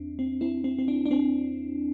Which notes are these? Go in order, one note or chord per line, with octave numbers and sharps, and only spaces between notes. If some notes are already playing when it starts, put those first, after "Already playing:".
Already playing: E2 C4 D4
C4
C4 E4
C4
C4
D4
D4
C4